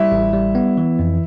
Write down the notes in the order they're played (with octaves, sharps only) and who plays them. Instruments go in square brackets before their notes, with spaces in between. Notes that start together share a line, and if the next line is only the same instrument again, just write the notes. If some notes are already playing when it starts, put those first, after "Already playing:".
Already playing: [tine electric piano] G3 [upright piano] E4
[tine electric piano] A1
G3
B3
E3
F2